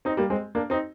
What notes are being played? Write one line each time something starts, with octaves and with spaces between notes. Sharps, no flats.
C4 D#4
G3 A#3
G#3 C4
A#3 D4
C4 D#4